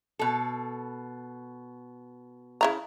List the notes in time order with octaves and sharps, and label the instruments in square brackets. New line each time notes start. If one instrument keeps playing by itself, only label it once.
[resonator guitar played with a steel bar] B2 A4
[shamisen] C#3 E4 A#5